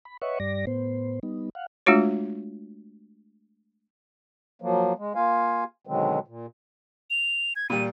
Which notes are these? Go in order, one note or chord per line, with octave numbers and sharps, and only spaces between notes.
B5
B4 C#5 D#5 E5 F#5 C#6
G2 G3 D5 A#6
A2 B3 C5
G3 B3 D#4
F5 F#5
G#3 A3 D4 F4 F#4 C#5
F3 F#3 A#3
G#3
A#3 F4 F5 G#5
B2 D3 D#3 F#3 G#3 C4
A#2
F7
G#6
A#2 G3 D#7